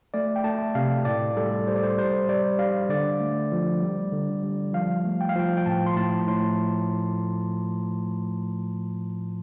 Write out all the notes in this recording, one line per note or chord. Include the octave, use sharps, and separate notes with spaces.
A3 D5
G5
A3 A5
C3 F5
A2 D5
G3 A4
G3 C5
D5
C5
G3 C5
G3 D5
G3 F5
D3 D5
A3
F3
G3
D3
G3
F3 F5
A3
G5
F5
F3 G5
G5
A2 A5
C6
A2 A5
A2 C6